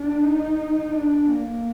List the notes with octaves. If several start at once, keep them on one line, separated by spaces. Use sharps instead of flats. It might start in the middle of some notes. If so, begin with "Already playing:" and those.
Already playing: D4
D#4
D4
A#3